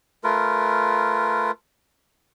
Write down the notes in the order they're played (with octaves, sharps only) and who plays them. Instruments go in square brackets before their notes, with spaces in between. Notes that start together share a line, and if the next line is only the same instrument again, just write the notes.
[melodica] A3 F4 A#4 B4